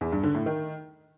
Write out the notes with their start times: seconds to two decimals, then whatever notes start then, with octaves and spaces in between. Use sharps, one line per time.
0.01 E2
0.12 G2
0.24 D3
0.35 A2
0.46 D#3